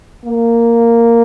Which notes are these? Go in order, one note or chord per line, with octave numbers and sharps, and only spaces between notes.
A#3